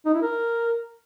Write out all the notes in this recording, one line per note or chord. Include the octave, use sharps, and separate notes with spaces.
D#4
E4
A#4